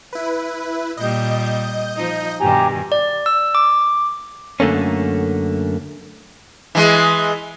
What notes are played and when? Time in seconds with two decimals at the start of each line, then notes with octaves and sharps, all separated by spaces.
0.13 E4 B4
0.97 A#2 G3 D#5 G6
1.97 F3 D#4
2.41 G2 B2 D#3 G4 G#5 A#5
2.92 D5
3.26 E6
3.55 D6
4.60 F#2 D3 A3 A#3 C#4
6.75 E3 G#3